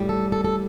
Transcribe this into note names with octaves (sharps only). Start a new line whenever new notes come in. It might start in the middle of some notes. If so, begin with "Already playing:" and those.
Already playing: A2 G3
A4
A4
A4